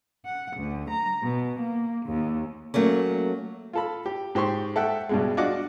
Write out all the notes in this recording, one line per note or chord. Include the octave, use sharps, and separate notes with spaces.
F#5
D2
A#5
B2
A#3
D#2
F#3 A3 A#3 C#4
F4 A4 B5
G4
G#2 G4 C5 C6 C#6
A4 E5 F#5 G5
G2 B2 G#3
D4 F4 F#4 D#5 F#5 D6